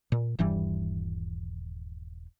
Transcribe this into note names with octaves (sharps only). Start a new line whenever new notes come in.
A#2
D#1 G2 E3 G3